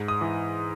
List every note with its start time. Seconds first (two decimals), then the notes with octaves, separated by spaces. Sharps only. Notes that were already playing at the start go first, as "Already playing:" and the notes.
Already playing: G#2
0.08 D#6
0.21 E3